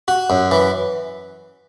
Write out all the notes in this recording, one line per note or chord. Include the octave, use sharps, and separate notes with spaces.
F#4
F#2
E3